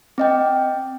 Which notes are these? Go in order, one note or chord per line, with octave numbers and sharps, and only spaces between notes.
C4 D#5 G5